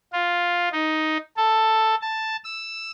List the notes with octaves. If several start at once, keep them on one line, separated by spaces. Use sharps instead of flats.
F4
D#4
A4
A5
E6